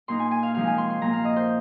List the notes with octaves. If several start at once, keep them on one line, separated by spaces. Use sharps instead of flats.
A#2 A#3 D#4 C6
G#5
G#5
F5
C3 F3 G#3 D#4 F5
G#5
C6
C6
A#2 F3 A#3 A#5
F5
D#5
C5